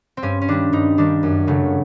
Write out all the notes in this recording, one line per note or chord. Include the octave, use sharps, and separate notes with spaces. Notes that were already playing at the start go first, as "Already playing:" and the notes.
C4
G2 C#4
C#4
D#3 G3 D4
G2 D#4
D#3 G3 D4
F#2
C#3 F#3 A3